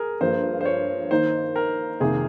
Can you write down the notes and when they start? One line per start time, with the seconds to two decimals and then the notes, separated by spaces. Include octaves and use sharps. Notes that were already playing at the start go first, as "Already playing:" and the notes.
Already playing: G#4 A#4
0.21 G2 F3 A#3 C5
0.61 C5
0.65 C#5
1.11 D#3 A#3 D#4 C5
1.56 A#4
2.00 F2 C3 D#3 A#3 G#4